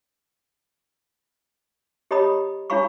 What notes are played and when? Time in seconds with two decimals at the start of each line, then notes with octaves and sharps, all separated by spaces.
2.11 G4 C#5 D#5 A#5 B5 D#6
2.70 D4 E4 C#5 F5 B5 C#6